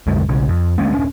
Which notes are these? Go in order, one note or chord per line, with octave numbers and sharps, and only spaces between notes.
C2 F#2 D3 G#3
B1 C#3
F2
D2 G#3 A#3 C#4
D#1 C#4 D4